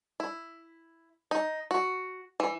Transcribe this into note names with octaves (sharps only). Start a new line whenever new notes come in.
E4
D#4
F#4
E3